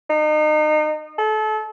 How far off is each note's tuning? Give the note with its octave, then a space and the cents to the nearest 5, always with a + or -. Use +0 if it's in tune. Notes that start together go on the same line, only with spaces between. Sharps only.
D#4 -30
A4 -30